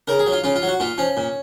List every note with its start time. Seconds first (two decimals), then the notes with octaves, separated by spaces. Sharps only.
0.07 C#3 A#4
0.19 G#4
0.26 F#3
0.32 F4
0.44 C#3 F4
0.56 F4
0.62 F#3
0.68 F#4
0.80 A#2 F4
0.98 F3 C#4
1.17 A#2